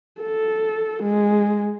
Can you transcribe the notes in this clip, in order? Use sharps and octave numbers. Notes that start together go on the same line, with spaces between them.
A4
G#3